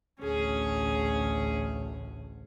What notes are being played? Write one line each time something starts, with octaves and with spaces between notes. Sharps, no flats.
A1 D2 C#4 G#4